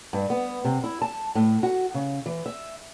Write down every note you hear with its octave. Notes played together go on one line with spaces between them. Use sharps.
G2
B3
C3
E4
A5
A2
F#4
C#3
E3
E5